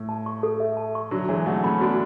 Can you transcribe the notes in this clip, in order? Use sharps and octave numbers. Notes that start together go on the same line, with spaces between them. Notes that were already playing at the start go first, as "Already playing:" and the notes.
Already playing: A2
A5
C#6
A4
E5
A5
C#6
D3 F#3 F#4
E3 G#3 C#5
F#3 A3 F#5
A3 C#4 B5
B3 D4 F#4